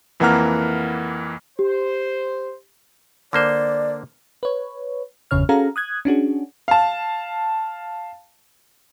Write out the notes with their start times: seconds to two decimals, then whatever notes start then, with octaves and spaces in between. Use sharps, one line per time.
0.20 F2 E3 A#3 F#5 A#5 F6
1.59 G4 C5
3.33 D3 A#3 C5 D5
4.43 B4 C#5
5.31 G1 E2 C#3 C#5 F6
5.49 C#4 F#4 G#4 A4 F5 A#5
5.76 D#6 F#6 G#6
6.05 C#4 D4 F#4 G#4
6.68 F5 A5